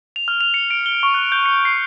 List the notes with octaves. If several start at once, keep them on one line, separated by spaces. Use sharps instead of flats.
F7
F6
F7
C#7
D7
G7
C#6
F#6
G6
C#7
C7